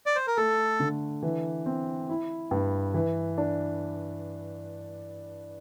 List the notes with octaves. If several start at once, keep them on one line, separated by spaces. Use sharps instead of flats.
D5
C5
A#4
A3 A4
D3
E3
C4
E4
G2
E3
D4